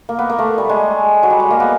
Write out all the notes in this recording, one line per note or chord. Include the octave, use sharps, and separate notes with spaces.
A#3
B3
A#3
A3
G3
G#3
F#3
G3
G#3
A#3
B3